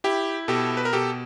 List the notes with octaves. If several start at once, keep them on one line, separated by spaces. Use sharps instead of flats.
E4 G4
B2 G4 A4
B4
A#4
B2 G4 A4